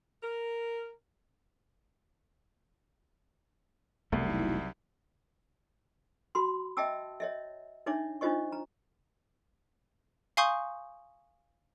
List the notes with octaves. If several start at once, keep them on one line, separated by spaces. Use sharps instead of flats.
A#4
E1 C2 F#3 A3 B3 D#4 E4
F#4 B5 C6
D#5 E5 G5 A5 D6 E6
C#5 D#5 E5
D4 D#4 C#5 E5 D6
D4 D#4 F4 C5 D#5 C#6
A#5
F5 G#5 C6 C#6 D#6 G6